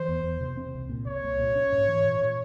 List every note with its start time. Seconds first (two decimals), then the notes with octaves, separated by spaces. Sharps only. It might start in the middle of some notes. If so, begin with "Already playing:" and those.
Already playing: E3 C5
0.08 E2
0.24 E2
0.41 C3
0.57 C4
0.74 C2
0.89 A#2
1.06 C2 C#5
1.23 C2
1.39 A#2
1.55 C#4
1.72 G#2
1.88 E3
2.04 A#2
2.21 A#2